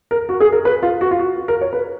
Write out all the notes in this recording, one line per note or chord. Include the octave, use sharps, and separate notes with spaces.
A#4
F#4
G#4
A#4
B4
F4
F#4
F4
F#4
F#4
A#4
C#5
B4